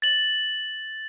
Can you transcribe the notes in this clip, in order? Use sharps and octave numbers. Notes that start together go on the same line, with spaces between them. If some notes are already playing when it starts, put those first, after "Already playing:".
A6 F#7